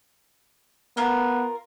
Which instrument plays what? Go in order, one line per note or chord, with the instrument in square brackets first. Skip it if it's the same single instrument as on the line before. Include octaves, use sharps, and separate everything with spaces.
[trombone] B3 [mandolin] F4 A#4